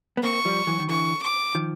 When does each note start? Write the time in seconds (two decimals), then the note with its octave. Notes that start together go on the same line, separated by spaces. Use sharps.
0.17 B3
0.23 A#3 C4 C#6
0.45 F3 G3
0.67 E3 F#3
0.80 D#3
0.89 D3 E3 C#6
1.23 D6
1.55 D#3 F3